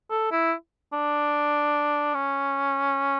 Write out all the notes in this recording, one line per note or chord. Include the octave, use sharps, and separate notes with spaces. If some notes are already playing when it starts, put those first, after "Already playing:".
A4
E4
D4
C#4